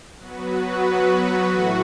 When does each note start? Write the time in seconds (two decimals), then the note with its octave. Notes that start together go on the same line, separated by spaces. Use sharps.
0.18 F#3 B3 F#4 B4
1.48 A2 E3 A3 F#4